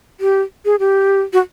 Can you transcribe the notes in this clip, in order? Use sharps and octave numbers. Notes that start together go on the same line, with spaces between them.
G4
G#4
G4
F#4